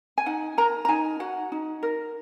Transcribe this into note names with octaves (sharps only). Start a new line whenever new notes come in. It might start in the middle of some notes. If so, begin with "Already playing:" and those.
G#5
D#4 F#5
A#4 A#5
A#5
D#4 G#5
F#4 F#5
D#4
A#4